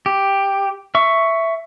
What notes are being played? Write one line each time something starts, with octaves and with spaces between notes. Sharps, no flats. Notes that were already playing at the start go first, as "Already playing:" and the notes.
G4
E5 C#6